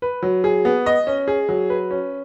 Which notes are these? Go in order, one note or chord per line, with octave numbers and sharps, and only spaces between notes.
B4
F#3
G#4
B3
D#5
C#4
G#4
F#3
B4
C#4